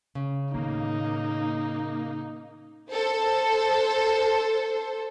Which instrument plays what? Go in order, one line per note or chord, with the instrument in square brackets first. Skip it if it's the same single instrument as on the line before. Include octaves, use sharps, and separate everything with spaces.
[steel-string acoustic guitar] C#3
[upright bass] A2 D#3 [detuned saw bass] A#3 [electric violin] D#4
[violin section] A4 C5